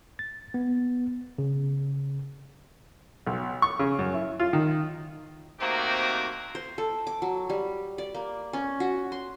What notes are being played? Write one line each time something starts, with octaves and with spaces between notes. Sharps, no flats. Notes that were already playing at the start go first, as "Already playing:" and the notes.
A6
B3
C#3
B1
C#6
C#3
F#2
E4
F4
D#3
C3 D#3 A3 A#3 C4 F#4
C5
A4
D6
F#3
G3
D5
A#3
C#4
F#4
C6